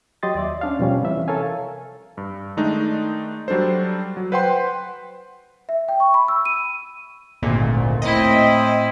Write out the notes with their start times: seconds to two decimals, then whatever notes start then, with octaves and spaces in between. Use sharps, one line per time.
0.23 F#3 G4 D#5 C6 A6
0.35 D#2 D5 E5
0.61 C#4 D4 F5
0.79 B2 F3 G3 C#4
1.03 C3 E3 E5 F5
1.28 A4 A#4 C#5 F5 G#5
2.17 G2
2.57 D#3 G#3 A3 D4 D#4
3.48 F#3 G3 D4 A4 C5
4.17 F#3
4.32 B4 C5 F#5 G5 C6
5.69 E5
5.88 G5
6.00 C#6
6.14 B5
6.28 E6
6.45 D#7
7.42 G#1 D2 A#2
8.02 A2 C4 E4 D#5